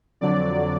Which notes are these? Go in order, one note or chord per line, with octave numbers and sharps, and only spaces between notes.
F2 D3 F#3 D5